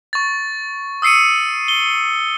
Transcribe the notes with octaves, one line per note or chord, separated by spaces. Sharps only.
C#6 A6
D#6 E6 C7 C#7 D#7
G7